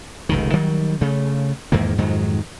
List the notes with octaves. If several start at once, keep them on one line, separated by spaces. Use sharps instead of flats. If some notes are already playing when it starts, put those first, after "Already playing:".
F1 C#2 D#3
D#3 F#3 G3
C#3 A3
E2 G#2 D#3 A#3
F2 G#2 D#3 F#3